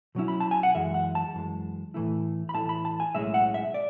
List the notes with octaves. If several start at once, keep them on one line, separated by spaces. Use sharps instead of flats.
B2 F#3 C#4 E4
B5
A5
G#5
F#5
F#2 E3 G#3 E5
F#5
A5
F#2 E3 G#3
A2 E3 A3 E4
B5
A2 E3 A3 E4 A5
B5
A5
G#5
B1 A2 G#3 C#4 E4 E5
F#5
E5
D5